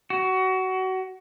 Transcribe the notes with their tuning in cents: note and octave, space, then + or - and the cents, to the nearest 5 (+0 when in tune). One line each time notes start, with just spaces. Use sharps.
F#4 +25